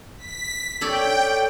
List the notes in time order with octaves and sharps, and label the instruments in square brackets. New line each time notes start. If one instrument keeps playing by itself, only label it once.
[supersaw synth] B6
[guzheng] A4 C#5 D5 [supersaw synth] G5